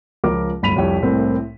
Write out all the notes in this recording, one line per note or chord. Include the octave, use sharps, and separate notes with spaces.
C#2 F3 A#4 D6
D1 G1 B5 B6 D#7 F7
C2 F2 G4 C#5
C2 A2 A#3 C4